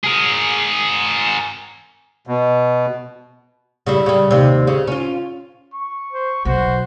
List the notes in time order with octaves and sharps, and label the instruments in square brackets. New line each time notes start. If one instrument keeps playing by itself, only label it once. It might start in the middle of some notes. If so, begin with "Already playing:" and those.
[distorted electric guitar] G#4 A#4
[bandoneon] B2
[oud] C#3 G3 E4
C#3 G3
D#2 C3
C#3
C#4 F4
[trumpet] C#6
[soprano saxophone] C5
[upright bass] B1 [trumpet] F#4 [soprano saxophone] C5